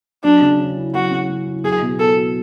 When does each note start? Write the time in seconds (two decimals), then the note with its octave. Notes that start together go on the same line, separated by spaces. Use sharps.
0.24 F#3 D4
0.41 C#3
0.60 C#4
0.77 E4
0.94 F#3 F#4
1.11 C#3
1.29 C#4
1.46 E4
1.64 F#3 G#4
1.82 B2
1.99 B3 A4
2.17 F#4